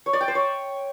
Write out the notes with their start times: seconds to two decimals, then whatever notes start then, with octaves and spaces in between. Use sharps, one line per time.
0.06 C#5
0.13 D5
0.21 G5
0.28 C5
0.35 C#5